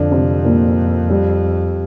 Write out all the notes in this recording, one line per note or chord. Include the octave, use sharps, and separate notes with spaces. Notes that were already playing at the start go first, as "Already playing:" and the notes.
Already playing: F2 D3 D4
C3 C4
A#2 A#3
G3